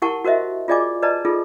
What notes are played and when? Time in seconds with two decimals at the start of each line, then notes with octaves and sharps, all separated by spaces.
0.02 E4 G4 A#4 F#5 A5 C#6
0.25 F#4 A#4 C5 D#5 E5
0.68 F4 G#4 D5 D#5 G#5 D6
1.03 B4 D5 D#5 A5 A#5
1.25 D#4 F4 G#4 A4